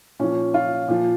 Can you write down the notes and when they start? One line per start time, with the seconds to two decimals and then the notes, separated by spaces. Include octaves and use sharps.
0.19 A#2 F3 C#4
0.54 F4
0.88 A#2 F3